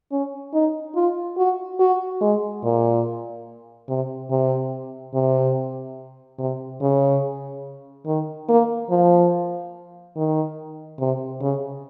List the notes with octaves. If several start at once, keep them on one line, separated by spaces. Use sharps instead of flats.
C#4
D#4
F4
F#4
F#4
G#3
A#2
C3
C3
C3
C3
C#3
D#3
A#3
F3
D#3
C3
C#3